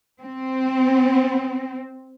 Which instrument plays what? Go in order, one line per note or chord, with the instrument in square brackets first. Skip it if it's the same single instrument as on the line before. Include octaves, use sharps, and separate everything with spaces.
[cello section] C4